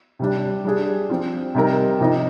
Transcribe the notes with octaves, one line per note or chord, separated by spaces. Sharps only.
C3 G3 D4
G3 D4 G#4
F3 C4 F4
C3 G3 C4 D#4 A#4
C3 F3 C4 D#4